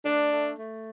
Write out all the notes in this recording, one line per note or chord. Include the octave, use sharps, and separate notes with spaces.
A3 D4
A3
A3